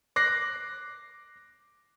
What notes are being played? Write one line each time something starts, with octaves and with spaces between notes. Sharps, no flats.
D6 F#6 A#6 C7